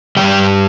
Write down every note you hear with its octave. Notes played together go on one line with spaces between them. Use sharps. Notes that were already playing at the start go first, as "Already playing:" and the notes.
G2 E3 G3 G5